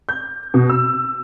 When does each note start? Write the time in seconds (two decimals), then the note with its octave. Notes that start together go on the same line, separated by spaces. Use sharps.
0.09 G6
0.54 B2
0.70 E6